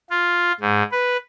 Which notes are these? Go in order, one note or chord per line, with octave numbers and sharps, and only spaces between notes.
F4
G#2
B4